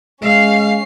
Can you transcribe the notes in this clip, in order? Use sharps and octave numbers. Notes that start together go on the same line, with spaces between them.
G#3 C#4 F5 C7